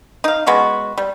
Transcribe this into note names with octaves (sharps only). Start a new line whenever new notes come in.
D#4 F5
G#3 B3 C#4 F#4
G3